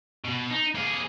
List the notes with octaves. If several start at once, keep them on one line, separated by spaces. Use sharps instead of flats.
B2
D#4
A#3 G#4